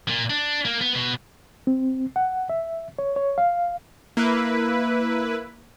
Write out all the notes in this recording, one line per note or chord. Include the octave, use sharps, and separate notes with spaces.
A#2
D4
A#3
B3
B2
C4
F#5
E5
C#5
C#5
F5
A#3 E4 B4